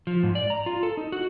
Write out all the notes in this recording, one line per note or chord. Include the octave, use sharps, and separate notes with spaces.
F3
G#2
D5
A#5
F4
A4
D#4
F#4